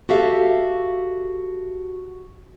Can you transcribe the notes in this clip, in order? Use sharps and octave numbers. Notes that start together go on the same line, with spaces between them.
F#4 G4 A4 E5 F5